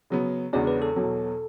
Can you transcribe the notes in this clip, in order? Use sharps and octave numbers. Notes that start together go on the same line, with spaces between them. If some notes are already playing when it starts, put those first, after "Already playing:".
C#3 F#3 B3
E2 C#3 G#3 D4 F#4 C#5
B4
A4
E2 B2 F#3